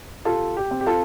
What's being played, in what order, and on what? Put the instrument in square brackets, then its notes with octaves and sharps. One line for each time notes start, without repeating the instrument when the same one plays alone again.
[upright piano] C3 F4 A4
G4
C4
G4
F4 A4